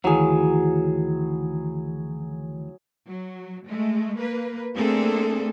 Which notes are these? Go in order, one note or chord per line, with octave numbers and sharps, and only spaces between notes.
D2 D#3 E3 F#3 G#4
F#3
G#3 A3
A#3 B4
A3 A#3 C4 D4 G#4 A4